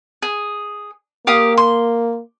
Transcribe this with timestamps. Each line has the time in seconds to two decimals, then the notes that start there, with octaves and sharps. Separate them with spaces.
0.22 G#4
1.27 A#3 G4 F5 D#6
1.57 C6